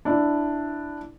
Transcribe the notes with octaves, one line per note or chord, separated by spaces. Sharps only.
D4 E4